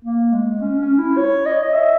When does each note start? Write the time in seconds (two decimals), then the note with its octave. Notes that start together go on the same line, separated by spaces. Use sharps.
0.05 A#3
0.33 G#3
0.61 C#4
0.80 C#4
0.98 E4
1.17 C#5
1.46 D#5
1.63 D#5
1.74 E5